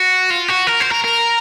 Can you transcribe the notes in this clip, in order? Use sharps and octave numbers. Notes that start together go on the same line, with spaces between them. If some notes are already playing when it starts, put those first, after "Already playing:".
Already playing: F#4
F4
F#4
A#4
C5
A#4
A#4